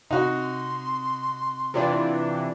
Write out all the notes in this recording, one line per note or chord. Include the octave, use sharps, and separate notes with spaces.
C3 D#4 F#4 C6
C3 E3 D4 F4 G4 D5